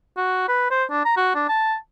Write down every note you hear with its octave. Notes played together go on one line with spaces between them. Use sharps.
F#4
B4
C5
D4
A#5
F#4
D4
A5